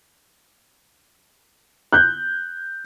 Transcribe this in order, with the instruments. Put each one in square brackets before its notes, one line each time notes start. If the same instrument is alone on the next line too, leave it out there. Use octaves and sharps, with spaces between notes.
[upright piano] F#6 G6